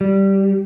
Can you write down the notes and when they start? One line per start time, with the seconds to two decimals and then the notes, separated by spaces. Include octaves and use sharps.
0.01 G3